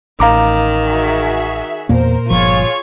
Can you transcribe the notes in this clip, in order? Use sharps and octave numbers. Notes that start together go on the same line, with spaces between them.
A1 D#3 F5 A#5 D6
F#4 G#4 E5
E2 A#2 A#3 A#4 C5
G1 F3 F4 G#4 C#5 C#6